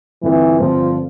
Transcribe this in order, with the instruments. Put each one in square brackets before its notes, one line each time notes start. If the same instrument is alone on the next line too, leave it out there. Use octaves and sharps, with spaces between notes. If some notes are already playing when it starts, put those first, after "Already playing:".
[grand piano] G2 D3 A3 C4 F4 [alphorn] E3
[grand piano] G2 D3 A3 C4 F4 [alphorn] F3